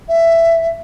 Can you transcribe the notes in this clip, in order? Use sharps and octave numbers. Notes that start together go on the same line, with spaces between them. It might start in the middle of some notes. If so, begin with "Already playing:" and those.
E5